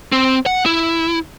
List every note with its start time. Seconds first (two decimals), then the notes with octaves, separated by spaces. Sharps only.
0.12 C4
0.46 F#5
0.66 E4